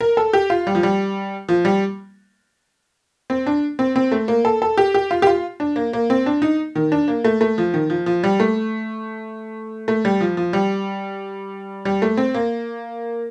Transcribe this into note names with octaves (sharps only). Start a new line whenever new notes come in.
A#4
A4
G4
F4
G3
F3
G3
F3
G3
C4
D4
C4
C4
A3
A#3
A4
A4
G4
G4
F4
G4
F4
D4
A#3
A#3
C4
D4
D#4
D#3
D4
A#3
A3
A3
F3
D#3
F3
F3
G3
A3
A3
G3
F3
F3
G3
G3
A3
C4
A#3